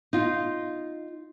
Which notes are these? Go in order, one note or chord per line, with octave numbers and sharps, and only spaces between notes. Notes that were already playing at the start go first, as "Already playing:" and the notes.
D#4 F4